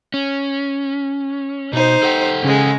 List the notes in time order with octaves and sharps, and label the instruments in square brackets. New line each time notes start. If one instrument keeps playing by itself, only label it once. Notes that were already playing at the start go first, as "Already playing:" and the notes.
[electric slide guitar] C#4
[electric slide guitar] B2 [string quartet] D#4 C5
[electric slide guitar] A4 F#5 G5
[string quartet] C#3 G#3